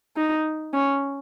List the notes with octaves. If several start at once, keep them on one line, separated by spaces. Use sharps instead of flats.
D#4
C#4